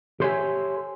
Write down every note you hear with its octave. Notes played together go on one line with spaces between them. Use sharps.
G4 A4 C5 C#5 E5 G#5